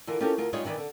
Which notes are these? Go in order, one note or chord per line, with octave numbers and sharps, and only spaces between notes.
D3 E3 F4 A#4
C#4 F4 G4 A4 A#4
D2 F4 A#4
G3 G#3 D#4 F4 G#4 C#5
D#3 E3 A#4 B4 D5
D3